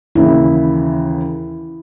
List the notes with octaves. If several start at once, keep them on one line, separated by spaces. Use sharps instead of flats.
D#2 C#3 E3 E4